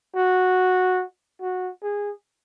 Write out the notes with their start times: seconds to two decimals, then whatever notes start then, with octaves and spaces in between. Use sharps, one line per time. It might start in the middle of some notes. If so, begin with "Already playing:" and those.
0.16 F#4
1.42 F#4
1.83 G#4